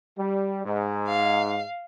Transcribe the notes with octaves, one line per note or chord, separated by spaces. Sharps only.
G3
G#2
F5